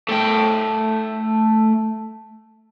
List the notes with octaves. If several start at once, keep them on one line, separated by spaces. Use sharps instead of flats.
A3 G5